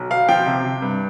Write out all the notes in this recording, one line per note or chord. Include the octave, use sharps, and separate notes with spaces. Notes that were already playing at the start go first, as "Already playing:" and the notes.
Already playing: B1
B2 F5
F3 G5
C3
C3
G2